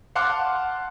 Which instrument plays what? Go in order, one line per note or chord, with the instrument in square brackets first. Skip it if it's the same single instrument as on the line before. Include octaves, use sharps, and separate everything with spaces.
[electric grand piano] F5 F#5 A5 C6 D6 F#6